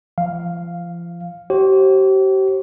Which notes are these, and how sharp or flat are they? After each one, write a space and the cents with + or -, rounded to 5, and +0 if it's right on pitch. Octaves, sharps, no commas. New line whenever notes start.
F3 -35 F5 +0
G4 -40 C5 +40